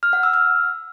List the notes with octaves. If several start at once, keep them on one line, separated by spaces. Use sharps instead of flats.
F6
F#5
E6
F6